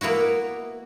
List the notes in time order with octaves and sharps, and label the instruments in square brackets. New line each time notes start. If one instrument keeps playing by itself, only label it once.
[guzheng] A#3 B3 E4 F#4